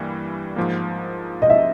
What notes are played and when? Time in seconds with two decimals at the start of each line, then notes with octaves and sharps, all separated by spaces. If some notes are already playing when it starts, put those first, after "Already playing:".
Already playing: G2 E3 G3 A#3
0.56 G#2 F3 A#3
1.42 D#5
1.50 E5